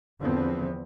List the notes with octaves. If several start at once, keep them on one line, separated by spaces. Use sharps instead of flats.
E2 D3 F3 B3 C4